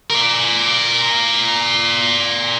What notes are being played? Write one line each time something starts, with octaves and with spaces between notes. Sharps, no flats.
A#4 D5